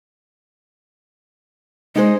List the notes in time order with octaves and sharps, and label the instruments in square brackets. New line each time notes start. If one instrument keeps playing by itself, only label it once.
[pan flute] G#3 [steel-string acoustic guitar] D#4 G#4 C5